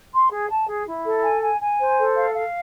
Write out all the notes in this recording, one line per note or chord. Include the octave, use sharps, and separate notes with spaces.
C6
G#4
A5
G#4
E4
A4
G#5
G#5
G#5
C5
A4
F5
F5